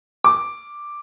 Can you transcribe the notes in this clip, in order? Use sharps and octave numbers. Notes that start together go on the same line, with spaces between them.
D6